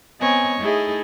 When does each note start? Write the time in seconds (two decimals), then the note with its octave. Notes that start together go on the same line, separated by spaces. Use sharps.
0.20 B3 C4 C#5 D#5 G#5
0.61 A3 D#4 E4 G#4 D#5